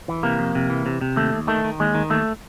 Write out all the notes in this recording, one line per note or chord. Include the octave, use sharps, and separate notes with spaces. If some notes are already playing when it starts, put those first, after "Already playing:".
E3
C3 A#3
F2
C3
E3
C3
C3
D#2 A3
D#2
D#3 A3
D#3
D#2 G#3
D#3
D#2 A3